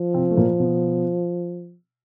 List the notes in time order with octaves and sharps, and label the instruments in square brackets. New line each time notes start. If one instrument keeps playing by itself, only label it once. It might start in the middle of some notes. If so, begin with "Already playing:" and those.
Already playing: [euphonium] F3
[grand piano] C3 C4
A3
A#2 A#3
B2 B3